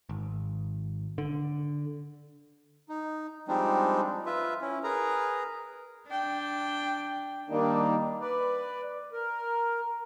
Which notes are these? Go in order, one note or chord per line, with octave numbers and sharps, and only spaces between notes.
G#1
D3
D#4
F3 G3 G#3 C4 D4 D#4
F4 B4 E5
C#4 E4
G#4 A#4 B4 A#5
D4 G5
D#3 G3 A#3 D4 D#4
B4 D5
A#4